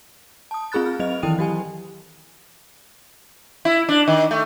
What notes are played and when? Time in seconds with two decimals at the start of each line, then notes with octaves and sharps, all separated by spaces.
0.51 A5 D#6
0.72 C4 F4 G#4 B5 F#6 A6
0.86 F6
1.00 F#3 C4 D#5 F7
1.23 D#3 E3 E4 G5 D#6 D#7
1.39 F#3 G4 G#5
3.65 E4
3.89 D4
4.08 D#3
4.31 A3